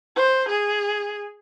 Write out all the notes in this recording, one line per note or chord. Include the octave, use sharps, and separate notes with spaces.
C5
G#4